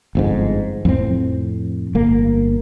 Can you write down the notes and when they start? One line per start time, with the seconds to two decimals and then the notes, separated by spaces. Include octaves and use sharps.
0.15 G1 F2 G#2
0.85 F2 A2 C4
1.95 G1 A#3